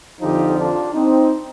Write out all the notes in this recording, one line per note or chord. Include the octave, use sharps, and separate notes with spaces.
F2 D3 F3 D#4 G4
D4 F4
C4 D#4